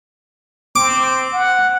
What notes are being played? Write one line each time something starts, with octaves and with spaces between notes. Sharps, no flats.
C4 D6
F#5